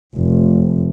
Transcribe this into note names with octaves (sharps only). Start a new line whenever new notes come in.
F1